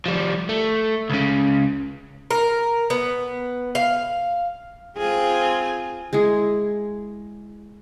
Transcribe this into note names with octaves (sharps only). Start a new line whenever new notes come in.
F3 G3
A3
C#2 C#3
A#4
B3
F5
C4 F4 G#4
G#3 E4 G#4